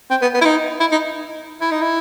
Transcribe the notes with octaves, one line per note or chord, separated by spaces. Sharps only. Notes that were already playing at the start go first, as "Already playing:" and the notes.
C4
B3
B3
E4
D#4
E4
D#4
E4
D#4
E4